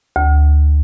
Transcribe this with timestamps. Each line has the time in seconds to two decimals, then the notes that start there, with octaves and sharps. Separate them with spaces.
0.16 D2